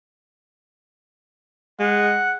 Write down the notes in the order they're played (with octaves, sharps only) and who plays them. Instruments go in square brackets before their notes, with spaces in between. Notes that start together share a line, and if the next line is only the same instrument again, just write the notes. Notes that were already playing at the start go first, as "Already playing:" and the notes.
[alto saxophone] G#3 [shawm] F#5